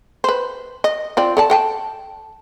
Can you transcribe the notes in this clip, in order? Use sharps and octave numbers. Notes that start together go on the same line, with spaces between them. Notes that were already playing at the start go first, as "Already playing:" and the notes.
B4 C5
D#5
C4 F4 D5
A4 D5 A5
A4 G5 A5